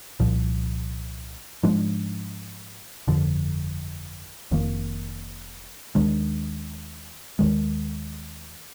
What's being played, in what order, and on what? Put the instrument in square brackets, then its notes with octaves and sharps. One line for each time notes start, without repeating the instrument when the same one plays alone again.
[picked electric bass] C2 A#2 F3
G#2 F3 G#3 D4
G1 F2 D3 F3
F1 F2 D#3 A#3
D#2 D#3 G#3 D4
D#2 D#3 G#3